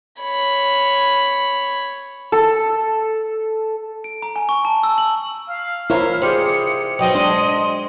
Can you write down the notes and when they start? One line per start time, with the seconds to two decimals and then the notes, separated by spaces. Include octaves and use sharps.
0.22 C#5 B5
2.32 A4
4.04 D7
4.22 A#5
4.36 G#5
4.49 C#6
4.65 A5
4.83 E6
4.98 F#7
5.48 F5 F6
5.90 E4 F4 A#4 C5 C#5
6.22 C3 G#4 C5 D5 C#7
6.99 B1 C4 D#5 G5
7.15 G#3 D4 C5 C6